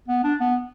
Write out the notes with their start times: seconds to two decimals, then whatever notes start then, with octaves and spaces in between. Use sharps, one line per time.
0.08 B3
0.24 D4
0.40 B3